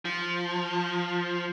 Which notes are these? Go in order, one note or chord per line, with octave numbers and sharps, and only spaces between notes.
F3